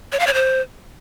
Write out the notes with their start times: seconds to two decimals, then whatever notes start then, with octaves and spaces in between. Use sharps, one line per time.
0.12 C#5
0.20 F5
0.27 C#5
0.34 C5